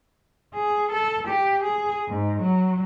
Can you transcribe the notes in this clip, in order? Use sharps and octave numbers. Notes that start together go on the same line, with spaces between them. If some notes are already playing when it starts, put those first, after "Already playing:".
G#4
A4
G4
G#4
G#2
F#3